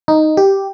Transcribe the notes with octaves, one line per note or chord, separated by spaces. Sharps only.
D#4
G4